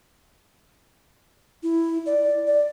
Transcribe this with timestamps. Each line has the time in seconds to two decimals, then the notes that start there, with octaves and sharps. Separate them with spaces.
1.63 E4
2.06 D5
2.47 D5